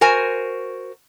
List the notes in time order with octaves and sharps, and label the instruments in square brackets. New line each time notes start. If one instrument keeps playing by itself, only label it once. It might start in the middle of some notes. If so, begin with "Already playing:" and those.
[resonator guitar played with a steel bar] F#4 A#4 C5 G#5